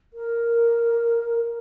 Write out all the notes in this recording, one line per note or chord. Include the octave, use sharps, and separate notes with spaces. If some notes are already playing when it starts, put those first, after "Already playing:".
A#4